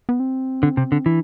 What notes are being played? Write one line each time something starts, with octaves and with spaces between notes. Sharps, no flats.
B3
C4
D3
C3
D3
E3 D4